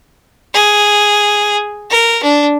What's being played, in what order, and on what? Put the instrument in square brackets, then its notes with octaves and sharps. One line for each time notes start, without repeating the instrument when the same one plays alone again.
[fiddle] G#4
A#4
D4